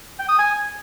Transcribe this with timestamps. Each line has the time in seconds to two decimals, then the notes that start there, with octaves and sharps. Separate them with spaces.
0.19 G5
0.29 D#6
0.39 G#5